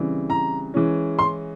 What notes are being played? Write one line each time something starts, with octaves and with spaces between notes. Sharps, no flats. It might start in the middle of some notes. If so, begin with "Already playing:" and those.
Already playing: C#3 E3 G3 C4
A#5
E3 G#3 C#4
C6